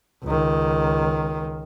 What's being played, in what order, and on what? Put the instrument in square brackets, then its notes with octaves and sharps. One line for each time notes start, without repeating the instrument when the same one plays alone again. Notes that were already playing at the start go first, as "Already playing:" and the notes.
[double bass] C#2 D#3